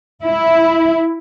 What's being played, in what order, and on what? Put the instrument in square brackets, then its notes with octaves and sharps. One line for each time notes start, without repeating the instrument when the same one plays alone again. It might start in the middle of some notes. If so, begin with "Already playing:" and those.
[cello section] E4